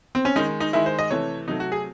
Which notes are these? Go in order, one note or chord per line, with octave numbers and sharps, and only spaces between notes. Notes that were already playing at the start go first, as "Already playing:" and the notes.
C4
C#4
D#3 G#3 D#4
D#4
D#3 G#3 E4
C5
D#5
C3 E3 A3 C#5
C3 F#3 A3 D#4
F#4
G#4